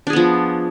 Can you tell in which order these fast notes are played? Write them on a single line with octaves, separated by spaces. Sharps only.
D4 G#4 B3 F3